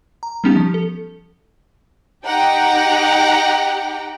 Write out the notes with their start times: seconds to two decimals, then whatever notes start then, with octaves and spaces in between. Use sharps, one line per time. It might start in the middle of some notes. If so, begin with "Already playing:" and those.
0.23 A#5
0.44 G3 B3 C#4 D#4 G4
0.56 F3
0.74 A4
2.25 D#4 G4 F#5 G5 A#5